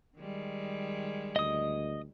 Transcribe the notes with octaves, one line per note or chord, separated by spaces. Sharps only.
D#3 G3 G#3
D2 D#5 D#6